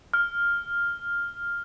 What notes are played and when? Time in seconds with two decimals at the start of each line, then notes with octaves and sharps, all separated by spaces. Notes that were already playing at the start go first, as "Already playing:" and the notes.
0.14 F6